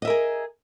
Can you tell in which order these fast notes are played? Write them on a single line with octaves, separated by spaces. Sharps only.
D#5 E5 A#4 G#4